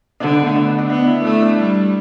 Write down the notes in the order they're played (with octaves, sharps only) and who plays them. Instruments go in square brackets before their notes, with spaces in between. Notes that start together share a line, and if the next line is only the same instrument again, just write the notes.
[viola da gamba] D3 [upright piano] D4
[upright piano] B3
A3
D4
B3
D4
[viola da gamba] B3 [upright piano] D4
[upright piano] E4
[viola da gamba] A3 [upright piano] E4
[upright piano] D4
[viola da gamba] G3